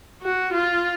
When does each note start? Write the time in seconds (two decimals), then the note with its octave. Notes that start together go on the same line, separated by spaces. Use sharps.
0.22 F#4
0.53 F4